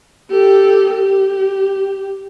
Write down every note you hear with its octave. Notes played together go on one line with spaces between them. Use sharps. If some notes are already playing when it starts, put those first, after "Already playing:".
G4 A4
G4